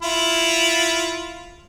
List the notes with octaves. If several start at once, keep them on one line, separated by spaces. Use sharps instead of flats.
E4 F4